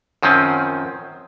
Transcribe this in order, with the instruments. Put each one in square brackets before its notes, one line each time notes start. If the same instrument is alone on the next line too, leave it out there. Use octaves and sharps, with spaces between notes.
[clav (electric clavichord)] F#2 D#3 F3 C4 C#4